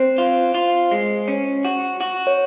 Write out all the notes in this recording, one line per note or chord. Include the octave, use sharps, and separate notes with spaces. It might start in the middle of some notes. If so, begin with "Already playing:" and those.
Already playing: C4 C5
F4
F4
G#3
C#4
F#4
F#4
C#5